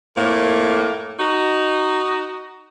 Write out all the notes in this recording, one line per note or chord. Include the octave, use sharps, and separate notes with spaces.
F2 A2 A#3
D#4 F#4